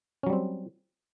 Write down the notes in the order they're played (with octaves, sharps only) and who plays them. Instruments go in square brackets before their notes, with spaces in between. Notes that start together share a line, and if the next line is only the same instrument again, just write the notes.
[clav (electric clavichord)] C#4
F#3
G3
C4